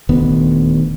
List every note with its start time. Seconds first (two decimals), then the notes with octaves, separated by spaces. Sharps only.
0.09 D#1 D2 D#3 B3